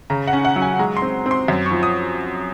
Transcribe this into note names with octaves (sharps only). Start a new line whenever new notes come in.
C#3 A#5
F#5
C#4
F#5
F#3
G#5
G#3 A#5
C6
C4
C4
C6
F#2
C#6
F3
D#6